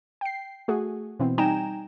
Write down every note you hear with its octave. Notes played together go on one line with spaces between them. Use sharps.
G5 C7
A3 F#4 G#4
B2 E3 C4
G3 D#4 G5 G#5 A#5 E7